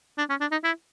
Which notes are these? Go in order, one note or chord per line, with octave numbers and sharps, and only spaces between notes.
D4
C#4
D4
D#4
E4